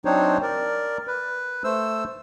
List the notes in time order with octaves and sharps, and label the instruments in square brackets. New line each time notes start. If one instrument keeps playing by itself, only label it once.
[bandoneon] F#3 C4 D4 D#4 C5 C#5
A#4 D5
B4
A3 C5 E6